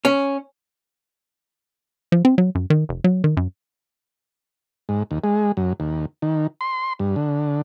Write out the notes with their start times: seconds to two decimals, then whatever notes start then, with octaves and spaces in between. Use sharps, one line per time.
0.05 C#4
2.12 F3
2.25 C4
2.38 F#3
2.55 F#2
2.70 D#3
2.89 F1
3.04 F#3
3.24 D#3
3.37 F#2
4.89 G#2
5.11 D#2
5.24 G#3
5.57 F#2
5.80 D#2
6.22 D#3
6.61 C6
6.99 G2
7.16 D3